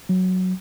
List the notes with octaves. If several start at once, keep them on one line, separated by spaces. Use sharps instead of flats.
F#3